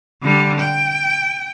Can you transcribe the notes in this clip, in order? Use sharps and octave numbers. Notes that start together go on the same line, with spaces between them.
D3 G3
G5